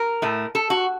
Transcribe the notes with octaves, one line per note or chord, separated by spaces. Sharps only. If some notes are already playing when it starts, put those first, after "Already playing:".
Already playing: A#4
A2 A3
A4
F#4